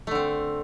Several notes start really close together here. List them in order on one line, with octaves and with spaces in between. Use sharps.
A3 D3 C4